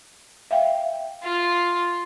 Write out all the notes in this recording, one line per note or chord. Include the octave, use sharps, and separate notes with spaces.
E5 F5 G5
F4